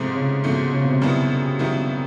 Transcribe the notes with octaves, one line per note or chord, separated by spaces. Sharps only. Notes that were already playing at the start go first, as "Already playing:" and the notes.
Already playing: G#2 C3 F3 A3
C#3
G#2 B2 F3 A3
C#3
B2
C3
F#2 D#3 G3 B3 E4
F#2 D#3 G3 B3 E4